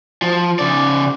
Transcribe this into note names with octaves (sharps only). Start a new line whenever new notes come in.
F3
C#3 D5